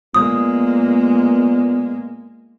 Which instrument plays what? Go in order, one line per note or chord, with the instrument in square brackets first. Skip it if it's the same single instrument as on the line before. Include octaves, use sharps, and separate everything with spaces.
[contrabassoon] A#2 [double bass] G#3 A#3 [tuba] B3 [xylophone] D#6